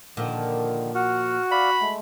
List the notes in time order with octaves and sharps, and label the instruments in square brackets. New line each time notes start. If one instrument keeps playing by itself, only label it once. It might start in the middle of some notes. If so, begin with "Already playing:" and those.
[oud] A#2 F3 [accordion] D3 D#3
[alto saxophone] F#4 [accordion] F#5 F6
[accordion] D5 F5 [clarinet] B5
[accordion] G#3 A3